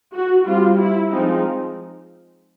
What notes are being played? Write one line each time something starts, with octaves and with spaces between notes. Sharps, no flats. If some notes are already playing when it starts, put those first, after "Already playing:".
F#4
G3 C4 F4
E4
F3 G#3 C4 D#4